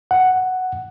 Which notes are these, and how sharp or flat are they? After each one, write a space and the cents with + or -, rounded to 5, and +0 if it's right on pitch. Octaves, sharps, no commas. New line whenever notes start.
F#5 +0